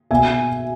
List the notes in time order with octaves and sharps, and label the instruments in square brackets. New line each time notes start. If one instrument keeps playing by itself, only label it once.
[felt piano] B2 E5 G#5